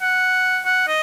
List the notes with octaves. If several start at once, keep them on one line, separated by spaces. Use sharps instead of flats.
F#5
F#5
D#5